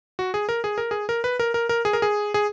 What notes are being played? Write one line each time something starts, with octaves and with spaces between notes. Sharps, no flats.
F#4
G#4
A#4
G#4
A#4
G#4
A#4
B4
A#4
A#4
A#4
G#4
A#4
G#4
G#4